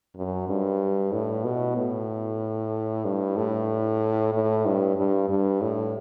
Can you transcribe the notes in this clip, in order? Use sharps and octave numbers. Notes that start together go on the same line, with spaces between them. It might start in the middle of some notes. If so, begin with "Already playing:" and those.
F#2
G2
A2
B2
A2
G2
A2
A2
G2
G2
G2
A2